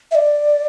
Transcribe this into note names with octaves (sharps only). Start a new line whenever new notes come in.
E5
D5